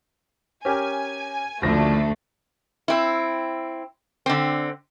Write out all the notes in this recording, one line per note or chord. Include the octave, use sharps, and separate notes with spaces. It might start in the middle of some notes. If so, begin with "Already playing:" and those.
C#4 G4 A#4 G#5
F#1 D2 F3 A3 A#6
C4 E4
D3 C4